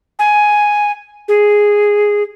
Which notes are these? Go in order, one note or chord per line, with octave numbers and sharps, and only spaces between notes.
G#5
G#4